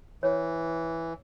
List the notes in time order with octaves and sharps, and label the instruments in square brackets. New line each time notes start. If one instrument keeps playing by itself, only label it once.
[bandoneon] E3 [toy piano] C#5